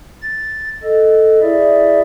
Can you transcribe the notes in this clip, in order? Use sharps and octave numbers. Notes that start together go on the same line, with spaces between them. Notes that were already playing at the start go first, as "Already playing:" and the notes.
A6
A4 D#5
E4 G#4 D5 E5